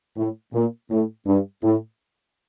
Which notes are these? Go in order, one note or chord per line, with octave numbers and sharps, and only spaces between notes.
A2
A#2
A2
G2
A2